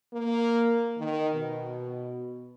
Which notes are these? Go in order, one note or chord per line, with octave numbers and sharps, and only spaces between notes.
A#3
D#3
B2